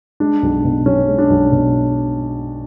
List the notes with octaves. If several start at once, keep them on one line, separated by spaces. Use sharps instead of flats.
G#3 D4
B1
B2
B1 C#4
G#3
D4
B1
B2